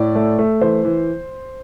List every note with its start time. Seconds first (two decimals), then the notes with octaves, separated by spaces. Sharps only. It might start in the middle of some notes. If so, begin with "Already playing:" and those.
Already playing: A2 D5
0.15 A3
0.39 A3
0.61 E3 C5
0.85 E3